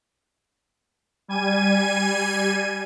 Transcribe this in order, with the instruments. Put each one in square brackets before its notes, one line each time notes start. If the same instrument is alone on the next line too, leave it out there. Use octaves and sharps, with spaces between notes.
[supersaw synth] G3 G#5 G#6 D#7